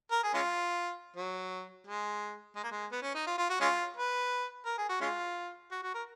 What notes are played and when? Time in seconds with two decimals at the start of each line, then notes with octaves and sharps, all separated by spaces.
0.11 A#4
0.23 G#4
0.34 G#3 C#4 F4
1.16 F#3
1.87 G#3
2.56 G#3
2.63 A#3
2.72 G#3
2.92 B3
3.02 C#4
3.15 D#4
3.27 F4
3.38 F4
3.50 F#4
3.60 G#3 C#4 F4
3.97 B4
4.65 A#4
4.78 G#4
4.89 F#4
5.01 G#3 C#4 F4
5.72 F#4
5.83 F#4
5.94 A#4